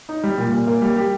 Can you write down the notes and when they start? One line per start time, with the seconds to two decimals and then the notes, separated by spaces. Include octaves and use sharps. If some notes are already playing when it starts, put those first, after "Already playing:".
0.09 D#4
0.23 G3
0.38 A#2
0.53 A#2
0.67 A#3
0.82 G3
0.96 G4